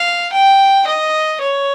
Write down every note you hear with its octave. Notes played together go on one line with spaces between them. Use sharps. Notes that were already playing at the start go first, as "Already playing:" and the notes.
Already playing: F5
G5
D#5
C#5